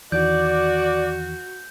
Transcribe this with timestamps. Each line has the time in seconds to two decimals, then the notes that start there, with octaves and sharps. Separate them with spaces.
0.12 E2 D#3 E3 F#4 D5 G6